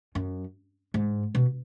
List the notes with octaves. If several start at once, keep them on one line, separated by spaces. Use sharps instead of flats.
F#2
G#2
B2